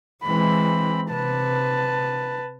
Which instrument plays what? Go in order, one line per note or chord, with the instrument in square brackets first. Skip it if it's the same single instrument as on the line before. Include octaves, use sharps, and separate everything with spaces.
[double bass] E3 G#3 [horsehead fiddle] C4 B5
[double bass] C3 [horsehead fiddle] B4 A5